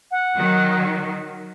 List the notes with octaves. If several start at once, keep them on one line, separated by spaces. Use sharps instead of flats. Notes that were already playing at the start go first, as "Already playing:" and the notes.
F#5
D#3 F#3